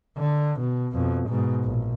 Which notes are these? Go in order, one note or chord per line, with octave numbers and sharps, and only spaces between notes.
D3
B2
F2 B2
G#2 B2
A#1